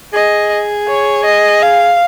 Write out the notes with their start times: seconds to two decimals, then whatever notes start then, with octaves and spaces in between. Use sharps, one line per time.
0.14 G#4 D#5
0.88 C#5
1.25 D#5
1.62 F5